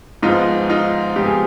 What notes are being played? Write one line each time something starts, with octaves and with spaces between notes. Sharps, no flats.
G#2 F3 G#3 B3 D#4 F4
D#4 F4
G#2 F3 G#3 B3 G4
G#4